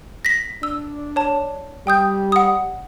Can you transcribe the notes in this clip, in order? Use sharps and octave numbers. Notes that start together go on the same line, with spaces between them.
A#6 B6
D4 E6
C#5 A5
G3 G5 D#6 G6
F#5 D#6